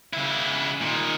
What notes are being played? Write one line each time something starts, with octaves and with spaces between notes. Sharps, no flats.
C#3 E4
A#2 D#3